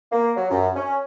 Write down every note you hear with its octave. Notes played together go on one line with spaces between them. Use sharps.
A#3
F#3
F#2
C#4